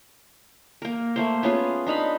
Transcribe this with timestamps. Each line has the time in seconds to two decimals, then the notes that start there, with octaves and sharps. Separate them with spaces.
0.82 A#3 A#4
1.16 A3 A#3 C5
1.43 B3 C#4 F4 G#4
1.87 D4 D#4 F5 B5